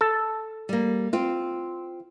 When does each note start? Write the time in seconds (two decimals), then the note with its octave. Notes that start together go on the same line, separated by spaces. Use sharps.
0.01 A4
0.69 G3 A#3
1.13 C4 F4